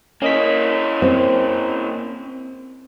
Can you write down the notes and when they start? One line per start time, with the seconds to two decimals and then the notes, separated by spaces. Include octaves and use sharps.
0.22 A#3 C#4 E4 D#5 B6
1.02 C4